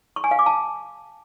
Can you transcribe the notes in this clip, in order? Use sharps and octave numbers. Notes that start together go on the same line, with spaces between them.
C#6
G#5
F5
D6
A5